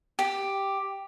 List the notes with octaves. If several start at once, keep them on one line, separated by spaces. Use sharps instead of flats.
G4